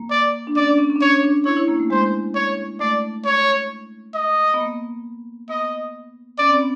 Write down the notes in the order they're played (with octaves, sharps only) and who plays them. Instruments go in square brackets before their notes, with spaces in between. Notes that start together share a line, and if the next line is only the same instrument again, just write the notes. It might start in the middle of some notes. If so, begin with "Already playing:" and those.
Already playing: [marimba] A#3
[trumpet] D5
[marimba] D4
[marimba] C#4 [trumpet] D5
[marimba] D4
C#4
C#4
D4
[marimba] C#4 [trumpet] C#5
[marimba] D4
[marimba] E4 [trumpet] C#5
[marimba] E4
A#3
A3
[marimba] G#3 [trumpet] C5
[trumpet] C#5
[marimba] A3 [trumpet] D5
[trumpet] C#5
D#5
[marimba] B3
A#3
[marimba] B3 [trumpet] D#5
[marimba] C#4 [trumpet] D5
[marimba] C4
B3